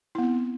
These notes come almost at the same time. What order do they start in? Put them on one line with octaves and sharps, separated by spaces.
E4 B3 C4